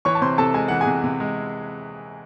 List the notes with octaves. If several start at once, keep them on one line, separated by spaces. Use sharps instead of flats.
E3 C#5 C#6
A5
C3 C5 C6
C3 A4 A5
G#3 G#5
E3 F#5
G#4 G#5
C3
C3
G#3